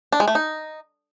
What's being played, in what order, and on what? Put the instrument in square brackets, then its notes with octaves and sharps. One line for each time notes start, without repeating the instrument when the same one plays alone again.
[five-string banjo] D4
G#3
A3
D#4